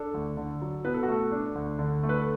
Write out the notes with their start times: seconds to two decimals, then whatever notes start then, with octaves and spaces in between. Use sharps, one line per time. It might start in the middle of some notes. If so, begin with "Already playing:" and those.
Already playing: D4 A4
0.14 D2
0.37 D3
0.62 F#3
0.84 B2 B4
0.94 A4
1.03 F#4
1.08 A3 A4
1.32 D4
1.55 D2
1.79 D3
2.03 A3
2.09 B4
2.18 A4